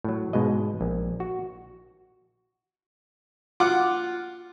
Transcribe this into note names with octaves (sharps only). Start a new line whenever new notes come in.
A2 F#3
G#2 B2 G#3 D#5
A#1
F#4
F4 F#5 D6